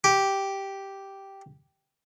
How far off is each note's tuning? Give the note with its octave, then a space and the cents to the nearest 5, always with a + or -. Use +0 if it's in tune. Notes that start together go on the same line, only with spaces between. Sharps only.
G4 -5